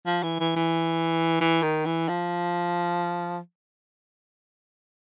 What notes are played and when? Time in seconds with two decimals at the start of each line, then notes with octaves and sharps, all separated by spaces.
0.06 F3
0.23 E3
0.40 E3
0.56 E3
1.41 E3
1.63 D#3
1.85 E3
2.08 F3